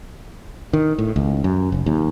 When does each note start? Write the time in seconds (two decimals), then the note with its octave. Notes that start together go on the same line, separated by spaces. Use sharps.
0.73 D#3
0.98 A2
1.16 C#2
1.44 F#2
1.72 F1
1.86 D#2